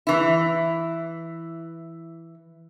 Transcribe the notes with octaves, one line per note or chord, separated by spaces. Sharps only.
E3 E4